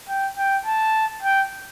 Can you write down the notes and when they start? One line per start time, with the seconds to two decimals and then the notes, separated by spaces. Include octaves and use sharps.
0.08 G5
0.37 G5
0.66 A5
1.22 G5